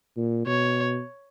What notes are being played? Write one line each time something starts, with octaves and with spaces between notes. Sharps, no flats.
A#2
B2 C#5